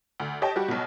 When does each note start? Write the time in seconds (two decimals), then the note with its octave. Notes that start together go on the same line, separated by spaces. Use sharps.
0.20 D2
0.42 G4 C#5 D#5 G5 A5
0.56 G3 F#4 G4
0.68 B1 B2